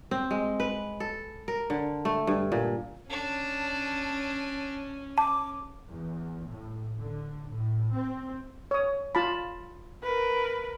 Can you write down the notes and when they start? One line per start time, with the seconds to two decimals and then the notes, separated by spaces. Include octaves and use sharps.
0.11 C4
0.31 G#3
0.60 B4
1.00 A4
1.48 A#4
1.70 D3
2.05 A3
2.27 G2
2.52 A#2
3.10 C#4 D4 A5
5.18 A5 D6
5.87 E2
6.47 A2
7.00 D3
7.50 A2
7.94 C4
8.71 C#5 D#6
9.15 F4 A5 B5
10.03 A#4 B4